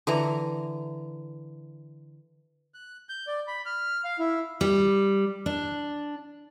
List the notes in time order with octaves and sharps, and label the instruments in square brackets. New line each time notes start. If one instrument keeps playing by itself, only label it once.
[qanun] D3 E3 A#5
[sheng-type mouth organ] F#6
G6
D5
B5
F6
F5
E4
[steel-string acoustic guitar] G3
D4